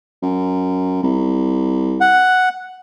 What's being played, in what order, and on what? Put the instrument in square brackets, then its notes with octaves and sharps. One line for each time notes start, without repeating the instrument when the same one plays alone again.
[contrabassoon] F#2
C2
[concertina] F#5